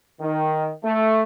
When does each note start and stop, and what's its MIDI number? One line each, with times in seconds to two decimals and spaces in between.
0.21 0.71 51
0.85 1.23 57